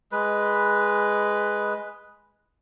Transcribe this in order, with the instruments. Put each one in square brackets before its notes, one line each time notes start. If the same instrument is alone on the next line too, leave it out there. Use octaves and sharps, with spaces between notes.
[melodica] G#3 B4